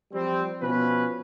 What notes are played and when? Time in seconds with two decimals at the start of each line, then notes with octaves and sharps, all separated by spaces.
0.13 F3 G3 C4
0.61 B2 F3 C#4 B4